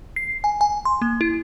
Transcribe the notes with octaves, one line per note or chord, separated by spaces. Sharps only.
C7
G#5
G#5
C6
A#3
E4